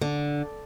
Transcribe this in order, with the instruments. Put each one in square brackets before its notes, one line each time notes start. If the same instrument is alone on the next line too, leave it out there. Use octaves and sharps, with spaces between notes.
[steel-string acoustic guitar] D3